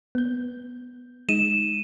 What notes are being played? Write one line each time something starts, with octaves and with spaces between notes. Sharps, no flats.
B3 G6
G#3 D#4 D#7 E7